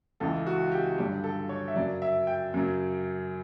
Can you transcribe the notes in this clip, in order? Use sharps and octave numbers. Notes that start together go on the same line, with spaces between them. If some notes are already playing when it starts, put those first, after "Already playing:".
C#2 C#3 E3 A4
F#4
G4
G2 D3 F#3 G4
A4
C#5
E5
F#2 C#3 F#3 D5
E5
G5
F#2 C#3 F#3